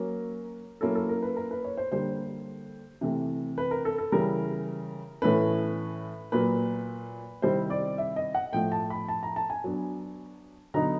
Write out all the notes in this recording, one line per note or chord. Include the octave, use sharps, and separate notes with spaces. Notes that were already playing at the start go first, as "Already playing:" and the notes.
Already playing: F#3 A#3 C#4 A#4
F#3 A#3 C#4 E4 A4
A4
A#4
B4
A#4
B4
C#5
C5
D3 G3 A#3 C5
C3 E3 A3
B4
A#4
A4
A4
C#3 E3 G3 A#4
A2 E3 A3 C#4 B4
A#2 F#3 A#3 B4
C3 D#3 G3 C4 E4 C5
D5
E5
D#5
F#5
A2 F3 A3 G5
A5
B5
A5
A#5
A5
G#5
F#3 B3 D4
D3 F#3 B3 D#4 A#5